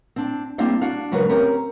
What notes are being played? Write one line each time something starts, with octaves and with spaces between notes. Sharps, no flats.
C4 D4
G3 A#3 C4 D4 E4 F5
D4 F#4 F5
C#3 F#3 G#3 F#4 A#4 B4
C4 C#4 G4 A#4